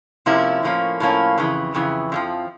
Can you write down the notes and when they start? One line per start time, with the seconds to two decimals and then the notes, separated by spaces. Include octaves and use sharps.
0.26 C3 F3 A#3 C#4 E4
0.63 A2 F3 A#3 C#4
1.00 A2 F3 A#3 C#4
1.38 F2 C#3 E3
1.74 F2 C#3 E3
2.12 F2 D3 F3